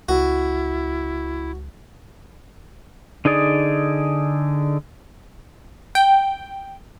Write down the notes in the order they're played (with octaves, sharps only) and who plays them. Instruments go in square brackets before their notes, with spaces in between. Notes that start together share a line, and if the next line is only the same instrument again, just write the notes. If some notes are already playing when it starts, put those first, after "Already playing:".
[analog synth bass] C#2 [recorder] E4 [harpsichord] F#4
[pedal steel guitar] D3 D#4 G#4 D5
[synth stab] G5